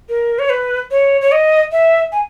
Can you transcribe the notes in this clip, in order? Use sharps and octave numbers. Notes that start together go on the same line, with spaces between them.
A#4
C#5
B4
C#5
C#5
D#5
E5
G#5